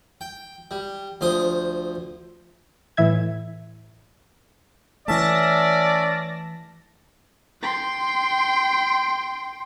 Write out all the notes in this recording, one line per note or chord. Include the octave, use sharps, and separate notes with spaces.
G5
G3
D2 F3 C5 C6 D#6
A2 E3 E5 G#6
E3 A3 C#4 D5 E5 A5 A#6
G5 C6